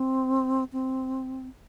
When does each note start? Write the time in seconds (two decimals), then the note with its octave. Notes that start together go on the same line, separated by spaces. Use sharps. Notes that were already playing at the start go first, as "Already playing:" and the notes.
Already playing: C4
0.73 C4